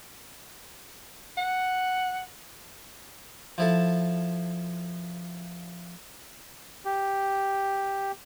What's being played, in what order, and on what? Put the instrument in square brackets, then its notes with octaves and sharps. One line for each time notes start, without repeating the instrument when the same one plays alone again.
[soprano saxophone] F#5
[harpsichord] F3 E4 A4
[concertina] G4